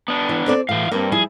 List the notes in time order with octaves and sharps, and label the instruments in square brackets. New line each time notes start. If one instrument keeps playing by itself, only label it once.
[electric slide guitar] B3 D4
[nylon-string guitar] E3
C4 A4 D5
[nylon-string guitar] A2 [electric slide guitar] E3 F5
[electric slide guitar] G2 [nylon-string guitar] A#3 C4
[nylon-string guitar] F3 G3 E4 [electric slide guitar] G#4